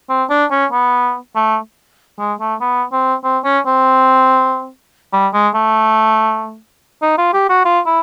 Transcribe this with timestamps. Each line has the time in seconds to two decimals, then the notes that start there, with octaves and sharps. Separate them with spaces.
0.09 C4
0.30 D4
0.51 C#4
0.72 B3
1.36 A3
2.19 G#3
2.40 A3
2.61 B3
2.92 C4
3.24 C4
3.44 C#4
3.66 C4
5.13 G3
5.34 G#3
5.55 A3
7.02 D#4
7.18 F4
7.33 G4
7.49 F#4
7.65 F4
7.86 E4